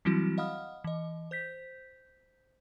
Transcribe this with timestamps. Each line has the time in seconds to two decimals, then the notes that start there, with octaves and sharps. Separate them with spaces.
0.05 E3 F#3 G3 C4 E4 F#4
0.38 D#5 F5 F#5 B5 D#6 F6
0.84 E3 D#5
1.31 C5 G6 B6